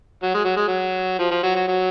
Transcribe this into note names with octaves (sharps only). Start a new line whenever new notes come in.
F#3
G#3
F#3
G#3
F#3
F3
F3
F#3
F#3
F#3